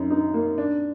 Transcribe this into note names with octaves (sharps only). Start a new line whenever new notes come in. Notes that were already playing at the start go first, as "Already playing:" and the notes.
Already playing: F#2 D#4
D#4
A#3
D4